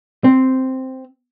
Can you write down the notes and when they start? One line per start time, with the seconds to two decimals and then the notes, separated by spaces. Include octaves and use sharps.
0.24 C4